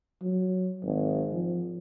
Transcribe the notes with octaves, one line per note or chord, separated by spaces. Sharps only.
F#3
G#1
F3